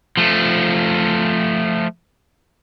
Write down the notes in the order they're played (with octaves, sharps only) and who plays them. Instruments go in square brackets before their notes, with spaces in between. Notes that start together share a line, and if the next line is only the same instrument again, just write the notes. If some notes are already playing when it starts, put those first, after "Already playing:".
[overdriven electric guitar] F3 A3